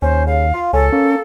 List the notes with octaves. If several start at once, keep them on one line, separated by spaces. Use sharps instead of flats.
D#2 C#4 C5
C#3 F5
F4
C#2 C#4 A4
A#3 C#4